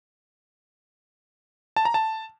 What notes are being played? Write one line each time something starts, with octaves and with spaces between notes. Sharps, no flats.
A5
A#5
A5